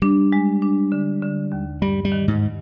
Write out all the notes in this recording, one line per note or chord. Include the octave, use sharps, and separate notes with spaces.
G3 D4
G#3
D4
D3
D3
D#2
G2 G3
G3
D#3
G#2